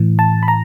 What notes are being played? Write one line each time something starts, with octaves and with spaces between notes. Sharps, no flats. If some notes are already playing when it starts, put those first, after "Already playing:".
Already playing: A2 E3
A5
B5
A#5